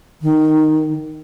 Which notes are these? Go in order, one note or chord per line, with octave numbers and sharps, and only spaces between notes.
D#3